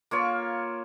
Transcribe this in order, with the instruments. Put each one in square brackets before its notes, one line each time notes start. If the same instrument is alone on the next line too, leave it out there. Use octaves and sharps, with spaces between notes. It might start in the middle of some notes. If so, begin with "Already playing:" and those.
[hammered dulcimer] A#3 F4 C#5